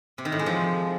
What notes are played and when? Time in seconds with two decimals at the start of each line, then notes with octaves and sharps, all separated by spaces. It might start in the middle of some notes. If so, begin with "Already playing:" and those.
0.18 C3
0.25 D#3
0.32 A2
0.39 G#3
0.46 F3